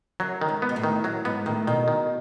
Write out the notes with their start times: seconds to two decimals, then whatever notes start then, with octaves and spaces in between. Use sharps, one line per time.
0.20 F#2 F#3
0.41 D#3
0.49 G#2
0.62 B3
0.69 B2
0.76 A2
0.84 D#3
1.04 F#2 F#3
1.25 G#2 B3
1.46 A2 D#3
1.67 B2 D#3
1.88 D#3